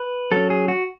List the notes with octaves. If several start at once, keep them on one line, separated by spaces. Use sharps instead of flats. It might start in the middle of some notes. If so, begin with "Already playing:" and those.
Already playing: B4
F#3 C#4 A4
G#4
F#4